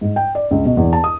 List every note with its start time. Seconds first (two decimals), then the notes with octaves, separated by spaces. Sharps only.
0.01 G#2
0.16 G5
0.35 D5
0.51 C#2
0.65 B2
0.77 E2
0.93 A5
1.04 D#6